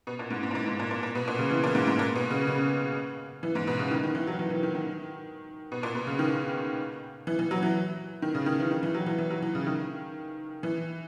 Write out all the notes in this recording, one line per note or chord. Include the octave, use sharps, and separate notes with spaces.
B2
A#2
G#2
G#2
A#2
G#2
G#2
A#2
A#2
A#2
B2
A#2
C#3
E3
A#2
G#2
G#2
A#2
B2
C#3
C#3
E3
G#2
B2
C#3
D#3
D#3
E3
F#3
E3
E3
D#3
D#3
B2
A#2
B2
C#3
D#3
E3
E3
F#3
E3
D#3
C#3
D#3
E3
D#3
E3
F#3
E3
E3
F#3
E3
C#3
D#3
E3